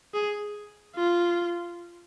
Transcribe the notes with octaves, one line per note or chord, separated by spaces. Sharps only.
G#4
F4